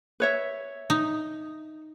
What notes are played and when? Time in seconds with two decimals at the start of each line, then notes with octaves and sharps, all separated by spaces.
0.20 B4 C#5 E5
0.90 D#4